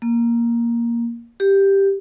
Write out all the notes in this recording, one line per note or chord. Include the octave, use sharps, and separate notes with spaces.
A#3
G4